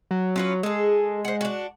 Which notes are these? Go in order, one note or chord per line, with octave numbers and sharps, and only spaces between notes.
F#3
F#3 C#4 F4 B4
G#3 G#4 A4
C5 F#5
D4 F#4